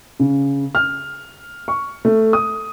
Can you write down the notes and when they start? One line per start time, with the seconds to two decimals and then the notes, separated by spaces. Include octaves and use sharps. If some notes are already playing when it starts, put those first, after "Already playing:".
0.20 C#3
0.75 F6
1.68 C#6
2.05 A3
2.33 D#6